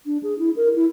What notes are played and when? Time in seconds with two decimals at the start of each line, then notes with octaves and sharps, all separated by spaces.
0.06 D4
0.23 G#4
0.39 E4
0.56 A#4
0.76 E4